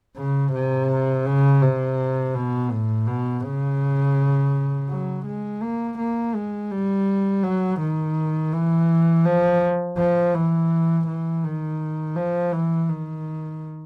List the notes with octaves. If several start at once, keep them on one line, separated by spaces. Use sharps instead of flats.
C#3
C3
C#3
C3
B2
A2
B2
C#3
F#3
G#3
A#3
A#3
G#3
G3
F#3
D#3
E3
F3
F3
E3
E3
D#3
F3
E3
D#3